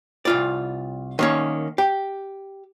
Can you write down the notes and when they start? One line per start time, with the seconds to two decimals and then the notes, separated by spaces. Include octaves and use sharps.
0.25 C2 F4 D5
1.19 D#3 A#3 C#4
1.78 G4